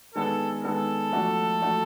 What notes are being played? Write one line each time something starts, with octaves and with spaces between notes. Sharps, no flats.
D#3 G#3 B3 D4 A4
D#3 G#3 B3 D4 A4
F3 A3 D4 F#4
F3 A3 D4 F#4